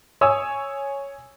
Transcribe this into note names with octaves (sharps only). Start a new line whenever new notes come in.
C#5 G#5 D#6 E6